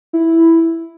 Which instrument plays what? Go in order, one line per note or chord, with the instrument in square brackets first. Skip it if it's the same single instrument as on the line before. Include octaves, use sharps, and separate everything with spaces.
[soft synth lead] E4